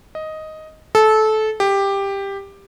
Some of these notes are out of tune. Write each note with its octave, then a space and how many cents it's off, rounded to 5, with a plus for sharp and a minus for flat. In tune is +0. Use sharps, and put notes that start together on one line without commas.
D#5 +5
A4 -20
G4 +10